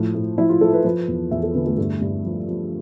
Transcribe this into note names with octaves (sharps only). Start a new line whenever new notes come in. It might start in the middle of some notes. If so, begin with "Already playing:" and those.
Already playing: A2 F3
A2
F3 E4
F4
F3 A4
B4
F3 B4
E2
E2 E5
A4
D3 B3
A3
G2 A3
G2
F3
F3